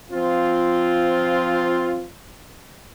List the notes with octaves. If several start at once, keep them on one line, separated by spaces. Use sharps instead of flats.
F3 C4 F4